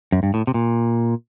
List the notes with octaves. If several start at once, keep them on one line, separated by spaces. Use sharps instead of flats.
F#2
G2
A2
C3
A#2